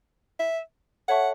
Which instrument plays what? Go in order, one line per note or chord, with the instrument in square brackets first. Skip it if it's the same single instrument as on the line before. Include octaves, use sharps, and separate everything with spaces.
[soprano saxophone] E5
[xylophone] A4 C#5 E5 A5 C#6 [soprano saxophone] F#5